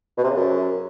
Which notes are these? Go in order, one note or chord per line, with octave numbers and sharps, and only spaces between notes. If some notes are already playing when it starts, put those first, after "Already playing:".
B2
C3
C#3
F#2